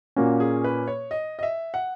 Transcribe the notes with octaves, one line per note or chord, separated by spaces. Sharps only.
A#2 A#3 C#4 F#4
G#4
B4
C#5
D#5
D#5
E5
F#5